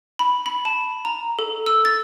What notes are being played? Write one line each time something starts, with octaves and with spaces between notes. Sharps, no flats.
B5
B5
A5
A#5
A4
E6
A6